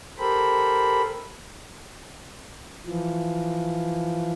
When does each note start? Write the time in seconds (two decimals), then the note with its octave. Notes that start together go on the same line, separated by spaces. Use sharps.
0.18 G4 A4 A#4 C5 B5
2.86 E3 F3